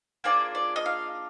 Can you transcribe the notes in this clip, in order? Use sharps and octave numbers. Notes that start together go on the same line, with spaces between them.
A#3 D4 F4 G#4 D5
D5
D#5
F5